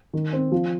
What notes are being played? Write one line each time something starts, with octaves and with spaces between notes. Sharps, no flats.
D#3
C4
F3